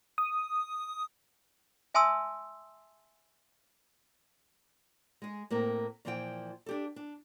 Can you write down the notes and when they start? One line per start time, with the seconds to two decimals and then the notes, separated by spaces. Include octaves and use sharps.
0.18 D#6
1.94 E5 G#5 A5 C6 D#6 E6
5.22 G#3 G#4
5.50 A2 A#3 C4 A#4
6.05 A#2 E3 F3 F4 G5
6.66 D4 G4 A4
6.96 D4